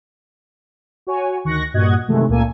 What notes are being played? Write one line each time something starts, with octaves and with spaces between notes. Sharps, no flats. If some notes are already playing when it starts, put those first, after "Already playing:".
F#4 C#5 G#5
D2 D#3 C#6 F#6 A#6
G2 A#2 F#4 D#5 F#5 G#6
C3 D#3 E3 F#3 G#3 A3
C#2 A#2 A#3 A4 G#5